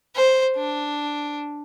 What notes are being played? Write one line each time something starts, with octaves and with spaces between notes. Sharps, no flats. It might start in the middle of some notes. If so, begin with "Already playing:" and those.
C5
D4